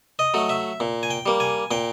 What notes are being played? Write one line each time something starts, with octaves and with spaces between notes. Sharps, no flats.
D#5
F#3 A3
E5
A#2
G#5
G5
G3 A#3
G#5
A#2 G5